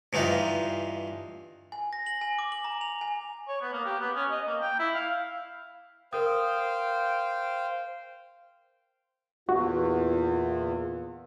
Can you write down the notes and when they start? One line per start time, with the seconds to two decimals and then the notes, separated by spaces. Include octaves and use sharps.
0.13 G2 E3 D#4 F4
1.72 G#5
1.93 A#6
2.06 F#7
2.21 G#5
2.39 D6
2.52 F#7
2.64 A#5
2.81 F7
3.01 G#5
3.48 C#5
3.61 B3
3.73 A#3
3.85 G4
4.00 B3
4.15 C#4
4.31 D#5
4.46 A#3
4.60 G5
4.79 E4
4.94 F5
6.13 A#4 C5 F5 G5 D#6
9.49 E2 A#2 B3 F4 F#4